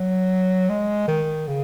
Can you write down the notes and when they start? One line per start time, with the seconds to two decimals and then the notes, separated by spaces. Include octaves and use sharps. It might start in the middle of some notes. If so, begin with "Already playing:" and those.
Already playing: F#3
0.70 G#3
1.08 D#3
1.48 C#3